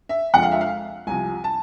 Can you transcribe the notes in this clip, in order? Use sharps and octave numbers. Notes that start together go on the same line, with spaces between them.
E5
F2 D3 F3 G#3 F#5
F5
E5
F5
C2 C3 F3 G#5
A5